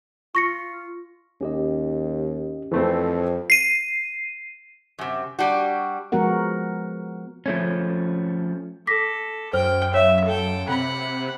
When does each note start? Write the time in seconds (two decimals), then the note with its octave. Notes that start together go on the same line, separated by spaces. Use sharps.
0.35 F4 C#6 A#6 C#7
1.41 D#2 C#4 G4 D#5
2.71 F2 E3 A3 C4
3.50 C7 D#7
4.99 F#2 C3
5.39 G3 D4 F#4
6.12 F3 G#3 B3 F#4 A#4 F#5
7.46 F3 A3 C#4
8.87 A4 D6 A#6 B6
9.53 F#2 C5 G5 F6
9.94 C#5 E5 F5
10.25 A4 G5
10.69 C3 F#5 B5